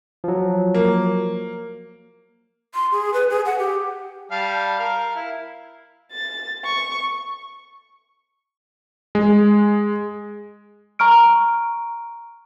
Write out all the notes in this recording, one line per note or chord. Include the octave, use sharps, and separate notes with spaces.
F3 F#3
A#3
C6
G#4
B4
G#4
F#5
G4
G3 F5 A5
A#4 F5
E4
A6
C#6
G#3
A#5 C#6 F6 D7